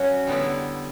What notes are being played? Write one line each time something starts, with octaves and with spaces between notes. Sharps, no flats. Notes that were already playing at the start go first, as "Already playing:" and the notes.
Already playing: F#3 C#4 F#4
D3 G3 B3 E4